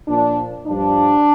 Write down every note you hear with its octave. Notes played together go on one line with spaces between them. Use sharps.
A#2 F3 D4
G2 F3 D4